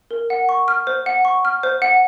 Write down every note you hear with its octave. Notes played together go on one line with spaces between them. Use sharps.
A#4
F#5
C#6
F6
C5
F#5
C#6
F6
C5
F#5